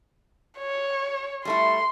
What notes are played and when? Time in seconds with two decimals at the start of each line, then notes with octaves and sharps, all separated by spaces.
0.59 C#5
1.45 G3 A3 E4 C6